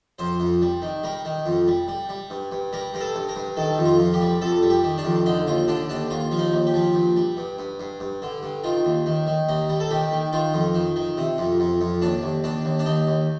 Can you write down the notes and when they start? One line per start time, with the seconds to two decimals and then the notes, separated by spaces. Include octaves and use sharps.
0.19 F2 C5
0.40 F2
0.62 G3
0.82 D#3
1.03 G3 A#4
1.25 D#3
1.46 F2
1.68 G3
1.88 G3
2.09 G3
2.30 G2
2.51 G2
2.73 G3 A#4
2.94 G2 A#4
3.00 A4
3.15 G2
3.29 A#4
3.36 G2
3.57 D#3 A4
3.78 F2
3.85 F4
3.99 F2
4.14 G4
4.21 G3
4.41 F2 A4
4.62 G3
4.70 G4
4.84 D#3
4.98 D4
5.05 F2
5.26 D3 D#4
5.47 D#2 F4
5.68 D3 D4
5.89 D#2 D4
6.10 D#2 F4
6.31 F3
6.39 D#4
6.53 D#2
6.67 G4
6.74 F3
6.95 G2
7.16 G3
7.37 G2
7.59 G2
7.80 G2
8.00 G2
8.22 D3
8.43 G2
8.64 D#3 F4
8.85 D#2
9.06 D#3
9.27 D#3
9.49 D#2 D#4
9.69 G3
9.80 A4
9.91 D#3 G4
10.12 D#3
10.33 D#3 F4
10.54 F2
10.75 D#3
10.96 D#3
11.17 C3
11.38 F2
11.60 F2
11.81 F2
12.02 D#2 D4
12.23 D#2
12.44 D#2 D4
12.65 D#2
12.79 D4
12.86 D#2 D#4
13.07 D#2